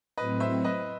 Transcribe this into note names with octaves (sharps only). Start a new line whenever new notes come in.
A2 F#3 C4 B4 D#5
C5 E5
B4 D#5